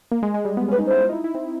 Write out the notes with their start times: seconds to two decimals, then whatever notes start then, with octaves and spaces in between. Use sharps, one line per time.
0.12 A#3
0.23 G#3
0.34 G#3
0.45 G3
0.57 B3
0.69 C#4
0.72 B4
0.79 D#4
0.87 E4 C5
1.02 F4
1.09 D#4
1.12 E4
1.24 E4
1.35 C4